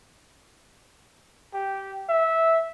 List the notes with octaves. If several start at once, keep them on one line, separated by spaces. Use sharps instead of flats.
G4
E5